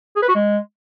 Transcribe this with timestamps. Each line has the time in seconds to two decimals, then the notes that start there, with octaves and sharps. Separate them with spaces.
0.16 G#4
0.22 B4
0.29 F#4
0.35 G#3